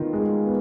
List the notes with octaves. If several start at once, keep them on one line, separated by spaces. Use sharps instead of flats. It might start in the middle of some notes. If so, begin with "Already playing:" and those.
Already playing: D#3 B3 F4
G#3
B3